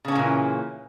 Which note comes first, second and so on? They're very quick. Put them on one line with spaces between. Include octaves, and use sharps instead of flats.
C#3 C#4 A#3 A#2 E3